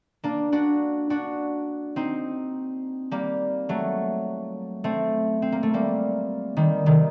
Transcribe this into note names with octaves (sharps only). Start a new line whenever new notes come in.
A#3 D4
D4 F#4
D4 F#4
C4 D#4
G3 A#3
F#3 A3
A3 C4
C4
A#3
A3
G3 A#3
D#3 G3
C3 D#3